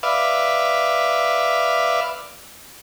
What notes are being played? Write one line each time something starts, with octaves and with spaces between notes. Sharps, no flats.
B4 D5 E5 F5